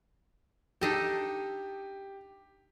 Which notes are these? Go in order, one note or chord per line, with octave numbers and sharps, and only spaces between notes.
D4 D#4 G4 A4